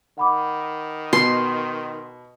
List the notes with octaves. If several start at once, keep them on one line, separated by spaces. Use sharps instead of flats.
D#3 F#5 B5 D6
B2 C6